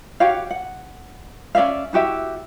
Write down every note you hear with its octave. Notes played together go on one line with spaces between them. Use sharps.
F#4 G4 C#5 F5
F#5
C#4 D5 E5 F5
E4 F#4 G4 E5